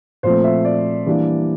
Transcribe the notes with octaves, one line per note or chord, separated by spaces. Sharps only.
A#2 F3 A3 C4 C5
E5
D5
E3 G3 A#3 D4